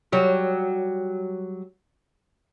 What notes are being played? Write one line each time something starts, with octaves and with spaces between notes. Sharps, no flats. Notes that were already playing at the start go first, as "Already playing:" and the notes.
F#3 G3